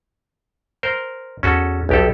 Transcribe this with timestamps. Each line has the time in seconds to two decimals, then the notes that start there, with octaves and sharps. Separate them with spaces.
0.83 A#4 C5
1.43 E2 C#4 F#4 A4
1.89 B1 G4 A4